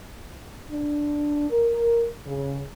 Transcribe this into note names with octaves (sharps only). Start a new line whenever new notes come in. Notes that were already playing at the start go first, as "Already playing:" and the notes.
D4
A#4
C#3